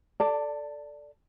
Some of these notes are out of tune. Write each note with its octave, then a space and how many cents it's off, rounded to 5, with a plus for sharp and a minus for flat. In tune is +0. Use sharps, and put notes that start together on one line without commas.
A4 +0 D5 -5 A5 +25